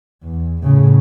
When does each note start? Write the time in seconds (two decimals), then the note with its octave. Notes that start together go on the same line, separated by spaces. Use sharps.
0.24 E2
0.63 A2 C#3